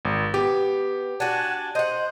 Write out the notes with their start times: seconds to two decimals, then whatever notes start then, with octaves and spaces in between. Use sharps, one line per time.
0.05 G#1
0.34 B3 G4
1.20 D4 F#4 F#5 G#5 A5
1.75 C5 D#5 F#5